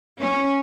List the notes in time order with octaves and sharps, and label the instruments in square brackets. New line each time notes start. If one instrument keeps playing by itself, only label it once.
[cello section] C#4